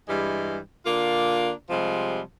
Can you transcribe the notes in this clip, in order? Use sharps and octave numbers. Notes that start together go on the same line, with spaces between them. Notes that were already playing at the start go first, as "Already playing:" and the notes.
G2 E3 G3 G#3
D3 A#3 D4 F4
C3 F3 G3 G#3